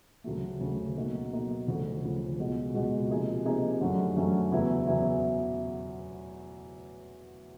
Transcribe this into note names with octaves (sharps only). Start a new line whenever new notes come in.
D2 C#3 F#3 A3
D2 C#3 F#3 A3
B2 F#3 A#3 D#4 F#4
B2 F#3 A#3 D#4 F#4
D2 C#3 F3
D2 C#3 F3
C#2 B2 G#3
C#2 B2 G#3
C3 F3 A#3 D#4 G#4
C3 F3 A#3 D#4 G#4
F#2 D3 F#3 A3 C#4
F#2 D3 F#3 A3 C#4
E2 C#3 F#3 B3 E4
E2 C#3 F#3 B3 E4